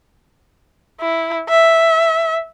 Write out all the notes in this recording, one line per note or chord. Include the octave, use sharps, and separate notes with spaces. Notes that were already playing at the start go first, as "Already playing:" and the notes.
E4
E5